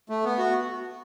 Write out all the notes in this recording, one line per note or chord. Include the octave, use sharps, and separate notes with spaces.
A3
B3
F#4